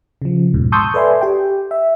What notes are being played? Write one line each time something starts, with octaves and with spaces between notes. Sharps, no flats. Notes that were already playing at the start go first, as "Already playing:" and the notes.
C#3 F3
E2 G#2 B2
A5 C6 C#6 D#6 E6 G6
A4 B4 D5 E5 G#5 C6
G4 G5
E5